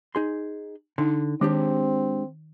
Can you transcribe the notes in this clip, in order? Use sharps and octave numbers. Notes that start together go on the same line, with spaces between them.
D#4 G#4 C6
D3 D#4
D#3 G#3 C4 D4 G4